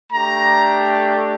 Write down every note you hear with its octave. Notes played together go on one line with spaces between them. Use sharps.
A3 D4 G4 A#5